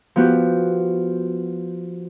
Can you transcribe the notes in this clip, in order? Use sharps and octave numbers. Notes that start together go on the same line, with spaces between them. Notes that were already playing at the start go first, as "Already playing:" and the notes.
F3 B3 F#4 G4